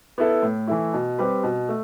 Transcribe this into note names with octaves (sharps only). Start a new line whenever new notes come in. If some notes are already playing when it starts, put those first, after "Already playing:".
B3 E4 A4
A2
E3 A3 E4
B2
G3 C4 G4 B4
B2
A3